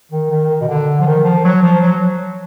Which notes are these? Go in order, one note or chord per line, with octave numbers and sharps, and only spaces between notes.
D#3
D#3
B2
D3
F3
D#3
F3
F#3
F3
F#3